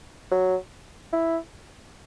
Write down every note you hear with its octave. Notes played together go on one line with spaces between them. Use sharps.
F#3
E4